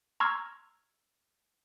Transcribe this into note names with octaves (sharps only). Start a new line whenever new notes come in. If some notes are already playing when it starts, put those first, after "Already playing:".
A#5 C6 C#6 E6 F6 G#6